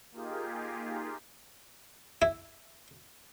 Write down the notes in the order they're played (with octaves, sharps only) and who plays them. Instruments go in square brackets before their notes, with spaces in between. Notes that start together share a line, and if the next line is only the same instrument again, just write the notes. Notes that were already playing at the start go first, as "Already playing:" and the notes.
[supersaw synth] A#3 D#4 F4 G4 G#4
[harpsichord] E4